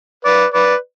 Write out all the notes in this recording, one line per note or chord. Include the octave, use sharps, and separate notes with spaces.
B4 D5
B4 D5